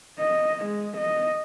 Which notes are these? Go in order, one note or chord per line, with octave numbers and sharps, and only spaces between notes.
D#5
G#3
D#5